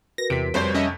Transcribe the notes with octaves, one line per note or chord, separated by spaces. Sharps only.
F#4 A#4 B4 A#6
E2 C3 B6 D7
F1 F2 G3 C5 C#5
C#4 D#5 E5